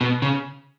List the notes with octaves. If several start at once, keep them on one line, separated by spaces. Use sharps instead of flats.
B2
C#3